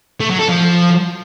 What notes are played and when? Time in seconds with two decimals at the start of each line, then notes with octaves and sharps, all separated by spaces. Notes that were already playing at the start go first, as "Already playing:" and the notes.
0.20 A3
0.30 F#3
0.39 A4
0.48 F3